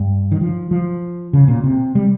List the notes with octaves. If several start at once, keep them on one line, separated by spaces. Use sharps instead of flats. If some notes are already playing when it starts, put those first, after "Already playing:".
Already playing: G2
D#3
F3
F3
C#3
A#2
C3
G3